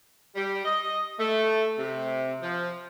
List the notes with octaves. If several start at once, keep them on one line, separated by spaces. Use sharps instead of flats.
G3
D#5
A3
C3
F3